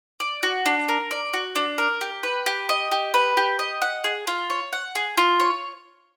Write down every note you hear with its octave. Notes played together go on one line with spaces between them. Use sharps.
D5
F#4
D4
A#4
D5
F#4
D4
A#4
G4
B4
G4
D#5
G4
B4
G4
D#5
F#5
G#4
F4
C#5
F#5
G#4
F4
C#5